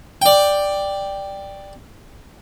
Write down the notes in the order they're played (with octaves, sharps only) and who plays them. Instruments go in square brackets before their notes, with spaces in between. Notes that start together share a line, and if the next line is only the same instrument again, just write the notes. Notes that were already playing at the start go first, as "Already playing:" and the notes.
[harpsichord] D5 G5